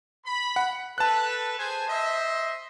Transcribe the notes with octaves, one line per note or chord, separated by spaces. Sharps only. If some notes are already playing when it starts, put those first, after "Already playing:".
B5
F#5
A4 B4 A5 F#6
G#4 C5 G#5
C5 D#5 E5